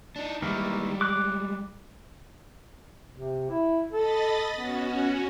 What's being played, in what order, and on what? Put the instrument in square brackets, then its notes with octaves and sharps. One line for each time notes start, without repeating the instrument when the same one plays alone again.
[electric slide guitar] D4 D#4
[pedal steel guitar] D#3 E3 A#3 [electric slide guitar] G3 G#3
[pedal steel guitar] D6 F#6
[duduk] C3
E4
[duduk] A4 [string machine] D#5 B5 A6
[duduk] B3 [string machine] C#4 F#4